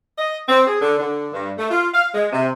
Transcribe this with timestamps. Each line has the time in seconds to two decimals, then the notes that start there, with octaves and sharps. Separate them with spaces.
0.18 D#5
0.48 C4
0.67 G#4
0.81 D3
0.99 D3
1.33 G2
1.58 A3
1.71 F4
1.94 F5
2.14 G#3
2.33 C3